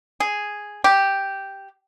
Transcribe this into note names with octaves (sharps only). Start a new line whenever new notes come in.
G#4
G4